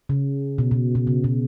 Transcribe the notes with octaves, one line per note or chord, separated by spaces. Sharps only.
C#3
B2
B2
B2
C#3
B2